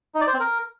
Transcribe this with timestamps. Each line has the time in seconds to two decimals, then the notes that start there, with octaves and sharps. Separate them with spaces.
0.15 D#4
0.21 D5
0.27 C5
0.34 C4
0.40 A#4